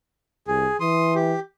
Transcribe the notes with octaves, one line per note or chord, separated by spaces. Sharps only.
C2 G#4
E3 C6 D#6
G4